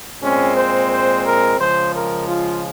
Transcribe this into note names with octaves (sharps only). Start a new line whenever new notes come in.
A#2 G#3 C4 C#4
C5
C5
A#4
C#3 F3 G#3 C5
A#4
F4